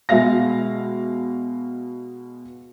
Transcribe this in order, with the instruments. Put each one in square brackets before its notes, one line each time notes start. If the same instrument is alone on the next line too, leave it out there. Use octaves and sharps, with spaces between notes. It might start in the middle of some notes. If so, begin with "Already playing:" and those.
[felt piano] B2 G#3 E5 F5 A#6